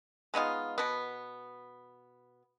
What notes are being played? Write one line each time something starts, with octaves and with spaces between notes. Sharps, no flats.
G#3 B3 D#4 F4
B2 B3